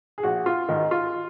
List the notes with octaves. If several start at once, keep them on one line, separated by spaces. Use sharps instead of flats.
G#4
A#1 F#4
F4
G#2 D#3 D#4
F4